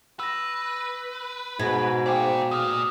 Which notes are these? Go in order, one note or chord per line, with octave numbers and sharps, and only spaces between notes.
B4 E6 A#6
G#2 B2 F#5 G#6
C5 D5 F5 G5 D6
A#2 D#6 F6